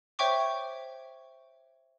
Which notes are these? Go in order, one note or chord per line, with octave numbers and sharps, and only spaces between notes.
C5 C#5 E5 G5 C#6 D6